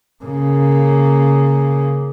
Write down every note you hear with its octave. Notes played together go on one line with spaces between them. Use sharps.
C#3 A#3